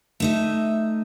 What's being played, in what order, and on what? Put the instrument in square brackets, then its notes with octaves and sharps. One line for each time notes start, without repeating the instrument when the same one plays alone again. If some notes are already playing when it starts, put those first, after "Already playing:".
[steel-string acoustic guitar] A3 D#4 E5